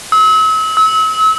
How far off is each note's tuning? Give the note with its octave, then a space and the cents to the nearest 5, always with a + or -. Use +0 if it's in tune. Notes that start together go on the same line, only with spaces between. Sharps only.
E6 -40
E6 -35